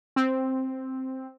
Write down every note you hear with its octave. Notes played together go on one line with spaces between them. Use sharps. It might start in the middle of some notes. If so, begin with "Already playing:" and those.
C4